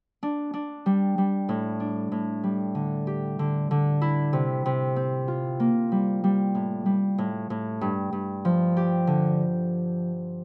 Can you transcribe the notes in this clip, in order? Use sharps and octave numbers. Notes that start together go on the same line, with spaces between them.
D4
D4
G3
G3
A2
D4
A2
G3
D3
G4
D3
D3
E4
C3
C3
C4
F4
A#3
G3
G3
A2
G3
A2
A2
G2
G2
F3
G4
D3